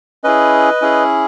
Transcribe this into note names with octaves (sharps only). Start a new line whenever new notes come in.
C#4 E4 G#4 B4 D#5
C#4 E4 G#4